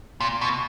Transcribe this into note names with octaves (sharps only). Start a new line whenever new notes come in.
A#2
B2